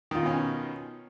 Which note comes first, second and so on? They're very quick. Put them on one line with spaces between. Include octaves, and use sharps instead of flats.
D#3 F4 D#4 B2 C#4